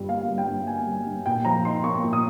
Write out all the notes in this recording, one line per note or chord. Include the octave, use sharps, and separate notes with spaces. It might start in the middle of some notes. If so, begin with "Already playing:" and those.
Already playing: G2 G3 F4
A#3 F5
G3
G5
G2
A#3 G#5
G3
G2
A#2 G5
F3 A#5
D#4 C6
A#3 C#6
A#2
D#6